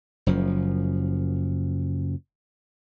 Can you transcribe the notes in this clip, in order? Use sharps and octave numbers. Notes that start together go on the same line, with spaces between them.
F#1 F#2 F3